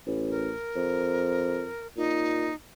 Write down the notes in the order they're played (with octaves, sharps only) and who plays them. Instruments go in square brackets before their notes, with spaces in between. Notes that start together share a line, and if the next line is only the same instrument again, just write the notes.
[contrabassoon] A1
[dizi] A#4
[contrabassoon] F2
[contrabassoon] A#2 [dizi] D#4